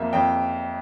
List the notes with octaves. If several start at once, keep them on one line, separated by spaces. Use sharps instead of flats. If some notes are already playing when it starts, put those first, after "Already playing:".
Already playing: F2 A#3 E5
F2 G5